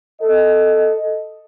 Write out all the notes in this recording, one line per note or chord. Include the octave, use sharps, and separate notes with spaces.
A4 D#5